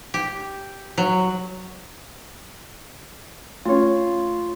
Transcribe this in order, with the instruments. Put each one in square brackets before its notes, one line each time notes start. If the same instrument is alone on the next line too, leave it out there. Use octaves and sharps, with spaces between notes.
[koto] G4
F#3
[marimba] A3 C#4 [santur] F4 C#5